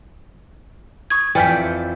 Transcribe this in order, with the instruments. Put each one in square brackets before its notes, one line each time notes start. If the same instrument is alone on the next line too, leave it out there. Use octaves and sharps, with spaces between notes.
[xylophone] C#6 D#6 G#6
[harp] F2 G6 C#7 [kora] E3 D5 [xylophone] G5 F6 B6